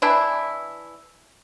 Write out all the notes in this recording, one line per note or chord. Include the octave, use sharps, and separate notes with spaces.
E3 D4 E4